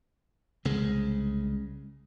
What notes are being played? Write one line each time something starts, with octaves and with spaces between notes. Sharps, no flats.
C2 C#3 G#3